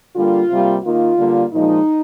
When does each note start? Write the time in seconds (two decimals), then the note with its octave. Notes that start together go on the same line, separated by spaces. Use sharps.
0.15 D3 G3 A#3 F4
0.50 C3 G3 A#3
0.83 D#3 A#3 F4
1.18 D3 G3 A#3
1.52 A#2 F3 G#3 D#4